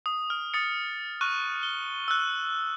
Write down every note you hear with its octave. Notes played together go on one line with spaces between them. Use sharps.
D#6
F6
D#6 A6 C#7
C#6 F6 F#6 D#7
G7
E6 F#6